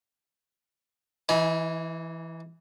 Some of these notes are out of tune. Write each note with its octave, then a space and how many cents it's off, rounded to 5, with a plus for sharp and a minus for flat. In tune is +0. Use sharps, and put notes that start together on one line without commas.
E3 +0 D#4 +45 G#5 +0